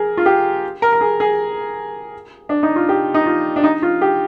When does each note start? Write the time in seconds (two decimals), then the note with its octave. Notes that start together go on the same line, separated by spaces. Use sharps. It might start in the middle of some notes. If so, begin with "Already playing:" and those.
Already playing: G#4 A#4
0.17 F4
0.26 G4
0.82 A#4
0.93 A#4
1.01 G#4
1.20 G#4
2.49 D4
2.63 D#4
2.76 F4
2.89 G4
3.14 D#4
3.26 F4
3.56 D4
3.64 D#4
3.82 F4
4.01 G4